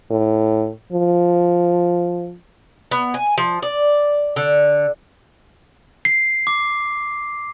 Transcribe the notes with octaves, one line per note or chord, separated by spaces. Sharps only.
A2
F3
B3
G#5
F3
D5
D3
C7
D6